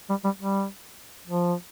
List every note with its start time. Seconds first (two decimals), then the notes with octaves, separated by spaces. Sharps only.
0.09 G3
0.24 G3
0.39 G3
1.27 F3